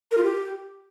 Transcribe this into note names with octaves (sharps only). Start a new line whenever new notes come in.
A#4
F4
G4